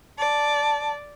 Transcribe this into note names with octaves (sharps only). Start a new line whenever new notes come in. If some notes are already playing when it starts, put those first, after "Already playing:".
D5 A5